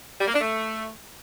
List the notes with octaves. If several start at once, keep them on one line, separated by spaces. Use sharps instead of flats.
G3
A#3
D4
A3